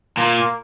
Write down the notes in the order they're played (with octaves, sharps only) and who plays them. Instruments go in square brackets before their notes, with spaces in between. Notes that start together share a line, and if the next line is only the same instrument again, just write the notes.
[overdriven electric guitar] A#2 [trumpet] A#3